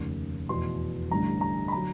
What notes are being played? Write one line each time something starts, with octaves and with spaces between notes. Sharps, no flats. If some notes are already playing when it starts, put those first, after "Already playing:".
Already playing: F1 D#2 C#3
F1 E2 B2 C6
A1 G2 D3 G3 A#5
A#5
B5
D3 F#3 A#5